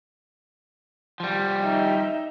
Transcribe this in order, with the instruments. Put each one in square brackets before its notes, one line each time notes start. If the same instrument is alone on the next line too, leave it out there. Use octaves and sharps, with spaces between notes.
[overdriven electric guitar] F3 G3
[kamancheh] D#4 E5